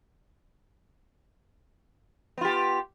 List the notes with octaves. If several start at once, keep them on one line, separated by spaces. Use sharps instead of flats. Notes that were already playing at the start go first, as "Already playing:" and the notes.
B3 F4 G4